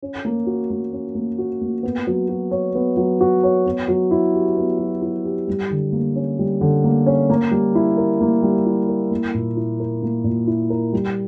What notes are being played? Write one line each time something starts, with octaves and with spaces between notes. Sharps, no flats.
C#4
A#3
F#4
A#3
C#4
A#3
F#4
A#3
B3
F#3
F#4
C#5
B3
F#3
F#4
C#5
B3
F#3
E4
G4
B3
F#3
E4
G4
G3
D3
A#3
C#4
G3
D3
A#3
C#4
A#3
G3
E4
A#4
A#3
G3
E4
A#4
A#3
A#2
E4
A#4
A#3
A#2
E4
A#4
G3